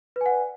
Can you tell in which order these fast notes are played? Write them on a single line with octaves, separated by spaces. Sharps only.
B4 G#5 F#5 D5